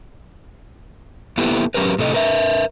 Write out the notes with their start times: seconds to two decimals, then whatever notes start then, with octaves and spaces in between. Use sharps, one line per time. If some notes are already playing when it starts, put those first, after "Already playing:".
1.38 A#3 B3 E4 G4 A4
1.74 F#3 C#4 G4 A#4 B4
1.99 A2 C3 A4 D#5
2.14 A#4 B4 E5